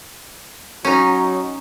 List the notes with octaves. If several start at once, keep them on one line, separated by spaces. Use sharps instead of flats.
F#3 C#4 D#4